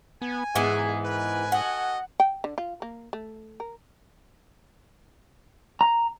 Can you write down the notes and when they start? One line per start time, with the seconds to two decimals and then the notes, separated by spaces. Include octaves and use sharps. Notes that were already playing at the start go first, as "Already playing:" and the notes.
0.22 B3 G#5
0.55 G#2 E3 G#3 B3 G#4
1.04 A#4 B4 G#5
1.52 F#4 A4 D#5 F#5
2.20 G5
2.44 D3
2.58 F4
2.82 A#3
3.13 A3
3.60 A#4
5.81 A#5